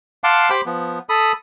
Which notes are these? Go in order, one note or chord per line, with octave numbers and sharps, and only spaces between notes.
F5 F#5 A5 C6 D6
G4 C5 G5 B5 D6
F3 B3
A4 B5 D#6